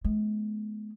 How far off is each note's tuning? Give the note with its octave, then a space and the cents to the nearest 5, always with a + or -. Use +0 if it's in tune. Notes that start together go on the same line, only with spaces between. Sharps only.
G#3 +40 B3 +0